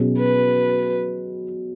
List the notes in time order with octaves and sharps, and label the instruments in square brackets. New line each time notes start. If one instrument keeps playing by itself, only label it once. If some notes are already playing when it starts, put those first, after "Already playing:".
Already playing: [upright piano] B2 F#3 C#4 G#4
[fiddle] B4